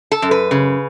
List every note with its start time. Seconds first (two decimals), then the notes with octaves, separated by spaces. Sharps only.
0.12 A4
0.22 F#2
0.31 B4
0.51 C#3